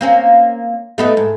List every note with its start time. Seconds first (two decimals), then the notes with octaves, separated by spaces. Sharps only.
0.01 A#3 C4 C#4
0.98 A3 B3 D#4
1.17 G#2